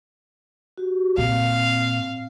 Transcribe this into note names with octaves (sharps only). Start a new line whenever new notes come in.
F#4 G4
A#2 C4 F5